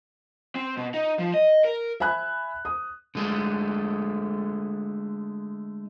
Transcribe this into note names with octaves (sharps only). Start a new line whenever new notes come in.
C4
B2
D#4
F3
D#5
A#4
E5 G#5 B5 F#6
D#6
D3 G#3 A3